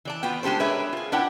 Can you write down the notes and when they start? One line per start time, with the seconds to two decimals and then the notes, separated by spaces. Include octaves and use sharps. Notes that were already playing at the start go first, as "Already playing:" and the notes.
0.05 E3 D5 A5
0.23 B3 F4 F#4 G5
0.43 G#3 D4 G4 A4 C5
0.60 D4 G#4 A#4 B4 C#5 E5
0.93 F4 G#4
1.12 D4 E4 B4 D5 F#5 G5